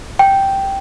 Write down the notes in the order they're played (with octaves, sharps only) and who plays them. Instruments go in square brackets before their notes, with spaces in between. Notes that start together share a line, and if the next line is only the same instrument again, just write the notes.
[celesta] G5